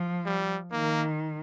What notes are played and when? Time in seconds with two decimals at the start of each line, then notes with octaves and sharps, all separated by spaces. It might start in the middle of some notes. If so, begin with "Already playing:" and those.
Already playing: F3
0.25 G3
0.72 D#3 A#3